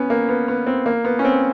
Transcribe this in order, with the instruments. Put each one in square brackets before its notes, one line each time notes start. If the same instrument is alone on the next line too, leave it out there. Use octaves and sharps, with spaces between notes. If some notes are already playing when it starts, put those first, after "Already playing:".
Already playing: [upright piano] B3 C#4
A#3
B3
B3
C4
A#3
B3
C#4
C4